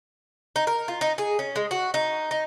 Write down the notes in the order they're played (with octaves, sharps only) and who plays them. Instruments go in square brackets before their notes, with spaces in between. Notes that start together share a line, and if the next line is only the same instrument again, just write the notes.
[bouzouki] D#4
A#4
F4
D#4
G#4
C#4
G#3
F#4
D#4
D#4